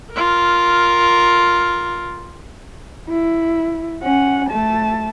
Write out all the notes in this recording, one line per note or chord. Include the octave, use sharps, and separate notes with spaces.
F4 A#4
E4
C#4 F#5
A3 A5